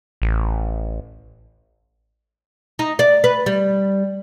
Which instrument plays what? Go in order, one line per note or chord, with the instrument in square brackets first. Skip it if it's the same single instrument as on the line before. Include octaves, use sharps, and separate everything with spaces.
[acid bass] A1
[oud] D#4
D5
B4
G3